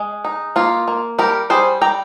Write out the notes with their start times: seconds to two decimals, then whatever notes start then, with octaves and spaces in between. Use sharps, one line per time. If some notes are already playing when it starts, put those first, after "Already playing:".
Already playing: G#3
0.25 D#4
0.56 A#3 F4
0.88 A#3
1.18 G3 G4 A#4
1.50 G3 G#4 C5
1.82 G3 G5 A#5